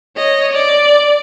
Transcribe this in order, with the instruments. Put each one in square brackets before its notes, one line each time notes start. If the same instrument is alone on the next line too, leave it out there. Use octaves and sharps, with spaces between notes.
[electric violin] C#5 D#5
D5